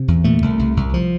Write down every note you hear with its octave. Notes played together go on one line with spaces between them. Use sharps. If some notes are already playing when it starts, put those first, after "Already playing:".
Already playing: C3
E2
A#2 A3
C2
C2
C2
F3